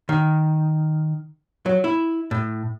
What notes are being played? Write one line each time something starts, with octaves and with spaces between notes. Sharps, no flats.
D#3
F#3
E4
A2